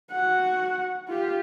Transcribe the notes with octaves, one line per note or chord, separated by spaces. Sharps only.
F#4 F#5
F4 G4